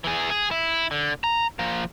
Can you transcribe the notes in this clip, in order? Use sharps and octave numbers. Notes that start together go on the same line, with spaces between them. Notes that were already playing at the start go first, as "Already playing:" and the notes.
E3 G#4
G#4
E4
D3
A#5
F3 A#3